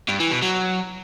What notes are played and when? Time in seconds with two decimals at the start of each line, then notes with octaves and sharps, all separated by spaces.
0.08 G2
0.20 E3
0.31 B2
0.42 F#3